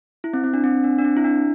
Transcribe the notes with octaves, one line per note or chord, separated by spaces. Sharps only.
E4
C4
C4
D4
C4
D4
D4
C4
E4
D4